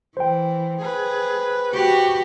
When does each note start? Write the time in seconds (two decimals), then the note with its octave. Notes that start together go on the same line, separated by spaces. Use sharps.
0.17 E3 C5 G5
0.82 G#4 B4
1.73 F#4 G4